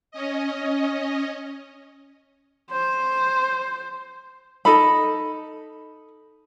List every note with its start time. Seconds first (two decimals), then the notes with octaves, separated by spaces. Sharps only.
0.11 C#4 D#5
2.71 C5
4.65 D#4 A4 B5